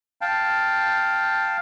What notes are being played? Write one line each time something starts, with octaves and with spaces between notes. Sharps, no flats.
F5 G5 A5